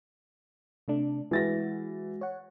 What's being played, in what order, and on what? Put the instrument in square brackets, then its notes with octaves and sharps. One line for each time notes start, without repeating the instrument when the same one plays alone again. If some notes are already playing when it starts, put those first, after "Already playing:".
[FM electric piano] C3 A3 D4
[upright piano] E3 A6 A#6 [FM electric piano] G#3 F#4
[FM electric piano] C#5 F#5